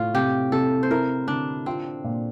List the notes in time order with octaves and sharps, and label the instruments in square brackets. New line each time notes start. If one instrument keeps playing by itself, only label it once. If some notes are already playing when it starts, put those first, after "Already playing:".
Already playing: [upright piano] A2 [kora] F4
[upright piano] C3 [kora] G4
[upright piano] C3 [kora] A4
[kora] C5
[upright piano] E4 [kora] A#4
[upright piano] D3 [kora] D4
[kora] C4 [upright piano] F4
[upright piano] A#2